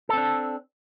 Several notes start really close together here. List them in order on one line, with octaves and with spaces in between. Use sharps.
A4 C4 D4